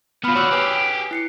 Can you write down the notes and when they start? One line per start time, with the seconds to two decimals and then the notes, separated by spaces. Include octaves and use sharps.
0.24 B3 F4 B5 F6
0.36 F#4 C#5 D5 E6 F#6
0.52 G4 G#4 B4 C7
1.11 E4 C7 C#7